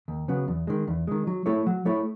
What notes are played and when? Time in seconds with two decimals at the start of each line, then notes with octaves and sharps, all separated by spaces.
0.08 D#2
0.28 C#3 F#3 B3
0.48 E2
0.67 D#3 G#3
0.88 E2
1.07 D#3 G#3
1.27 F#3
1.46 A3 E4 A4 C#5
1.67 F#3
1.85 A3 E4 A4 C#5